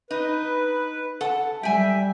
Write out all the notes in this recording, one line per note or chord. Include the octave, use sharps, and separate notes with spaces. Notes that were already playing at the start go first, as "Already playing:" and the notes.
D#4 B4
A4 F#5 A5
G3 E5 G5 G#5